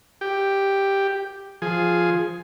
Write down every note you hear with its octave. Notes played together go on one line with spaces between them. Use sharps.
G4
F3 G#4